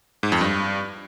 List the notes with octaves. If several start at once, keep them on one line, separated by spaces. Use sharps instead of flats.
G#2
F2
G2